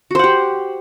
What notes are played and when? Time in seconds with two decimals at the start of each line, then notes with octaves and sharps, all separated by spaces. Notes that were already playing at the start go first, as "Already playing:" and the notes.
0.11 F#4
0.15 C5
0.19 F#5
0.24 G4